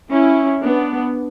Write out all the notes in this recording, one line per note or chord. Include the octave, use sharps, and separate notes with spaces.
C#4 E4
B3 D4